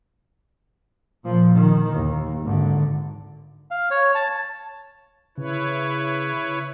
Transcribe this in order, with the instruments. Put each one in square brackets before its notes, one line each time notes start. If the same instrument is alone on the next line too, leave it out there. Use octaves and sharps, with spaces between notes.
[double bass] A#2 F3
D#3
D#2
G#1 D3
[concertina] F5
C#5
A5
[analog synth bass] C#3 [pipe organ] E4 B4 C#5